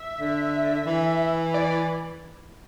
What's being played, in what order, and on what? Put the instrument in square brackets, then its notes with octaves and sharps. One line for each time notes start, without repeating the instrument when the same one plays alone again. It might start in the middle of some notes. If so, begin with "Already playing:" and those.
Already playing: [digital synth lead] E5
[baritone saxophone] D3
E3
[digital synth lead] D5